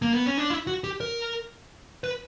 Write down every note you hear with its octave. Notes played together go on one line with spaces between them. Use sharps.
A#3
B3
C#4
D4
E4
F#4
G4
A#4
B4